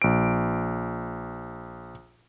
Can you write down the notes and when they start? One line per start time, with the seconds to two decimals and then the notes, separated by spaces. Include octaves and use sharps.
0.02 A#1 D7